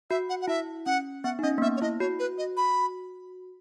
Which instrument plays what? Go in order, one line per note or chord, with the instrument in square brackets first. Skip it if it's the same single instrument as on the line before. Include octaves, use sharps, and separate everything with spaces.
[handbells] F#4 [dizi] E5
[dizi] F#5
F#5
[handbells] E4 [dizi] E5
[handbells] C#4 [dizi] F#5
[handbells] B3 [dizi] F#5
[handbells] D#4
[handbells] C#4 [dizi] D#5
[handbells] A#3
[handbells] B3 [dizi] E5
[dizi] C#5
[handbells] E4 [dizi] D#5
[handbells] F#4 [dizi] C#5
[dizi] B4
D#5
B5